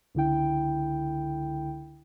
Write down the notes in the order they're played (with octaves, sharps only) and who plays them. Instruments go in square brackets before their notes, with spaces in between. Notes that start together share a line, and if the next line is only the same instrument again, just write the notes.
[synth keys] C#2 D3 E4 G5